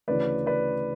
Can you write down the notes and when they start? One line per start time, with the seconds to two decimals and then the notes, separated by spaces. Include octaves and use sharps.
0.08 D2 C#3 E3 B4 D5
0.46 B4 D5